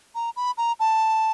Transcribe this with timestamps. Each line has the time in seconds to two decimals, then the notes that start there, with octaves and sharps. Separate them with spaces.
0.15 A#5
0.36 B5
0.57 A#5
0.80 A5